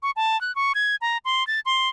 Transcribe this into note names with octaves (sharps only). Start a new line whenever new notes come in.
C#6
A5
F#6
C#6
G#6
A#5
C6
A6
C6